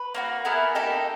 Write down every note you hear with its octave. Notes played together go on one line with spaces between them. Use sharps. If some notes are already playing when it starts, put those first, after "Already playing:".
Already playing: B4
A#3 D4 F#4
B3 E4 G#4 A#4
A#3 D#4 G4 A4